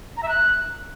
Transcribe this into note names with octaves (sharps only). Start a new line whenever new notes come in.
A#5
E5
F#6